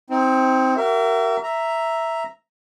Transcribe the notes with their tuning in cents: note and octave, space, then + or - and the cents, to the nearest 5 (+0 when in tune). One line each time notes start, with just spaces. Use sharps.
C4 +0 D#4 +35
F#4 +45 A#4 -10 E5 +30
E5 +0 A#5 +0